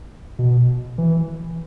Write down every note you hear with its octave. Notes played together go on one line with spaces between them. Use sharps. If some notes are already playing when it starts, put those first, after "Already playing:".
B2
E3